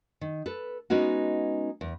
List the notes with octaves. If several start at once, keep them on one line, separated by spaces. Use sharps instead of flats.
D#3
A4 B4
G#3 B3 C#4 D#4 F#4
E2